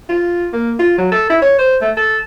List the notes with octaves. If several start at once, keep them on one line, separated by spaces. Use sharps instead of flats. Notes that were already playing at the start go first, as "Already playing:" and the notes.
F4
A#3
F4
F#3
A4
E4
C#5
C5
A3
A4